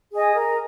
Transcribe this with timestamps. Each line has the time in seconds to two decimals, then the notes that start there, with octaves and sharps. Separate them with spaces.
0.11 G#4 D#5 G#5
0.35 A#4